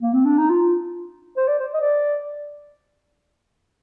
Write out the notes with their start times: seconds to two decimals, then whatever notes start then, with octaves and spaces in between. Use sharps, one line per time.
0.02 A#3
0.14 C4
0.25 D4
0.38 D#4
0.50 F4
1.37 C5
1.48 D5
1.59 C5
1.74 D#5
1.80 D5